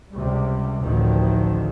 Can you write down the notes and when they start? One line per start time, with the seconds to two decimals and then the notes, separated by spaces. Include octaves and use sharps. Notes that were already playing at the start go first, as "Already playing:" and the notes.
0.11 C#2 C3 G3
0.81 A1 D2 A2 D3 D#3 F3